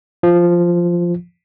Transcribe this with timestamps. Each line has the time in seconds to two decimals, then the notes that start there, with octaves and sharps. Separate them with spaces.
0.23 F3